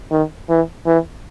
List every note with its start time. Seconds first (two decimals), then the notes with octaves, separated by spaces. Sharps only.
0.11 D#3
0.49 E3
0.86 E3